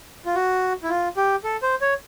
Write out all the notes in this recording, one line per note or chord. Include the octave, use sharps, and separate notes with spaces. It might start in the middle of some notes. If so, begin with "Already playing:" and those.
F4
F#4
E4
F4
G4
A4
C5
C#5